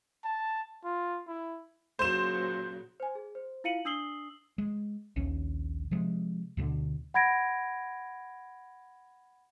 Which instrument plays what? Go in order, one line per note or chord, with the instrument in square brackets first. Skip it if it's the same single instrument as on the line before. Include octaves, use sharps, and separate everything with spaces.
[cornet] A5
F4
E4
[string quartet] A#2 C#3 F#3 [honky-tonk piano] C5 E7
[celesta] C5 G#5
G#4
C5
E4 F4 F5 C#7 D#7 F#7
D4 D#6 E6 C7 F#7 G7
[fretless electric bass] G#3
A#1 D#2 C#4
C3 F3 G#3
D2 B2 D3
[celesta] F#5 B5 G#6 A#6 D7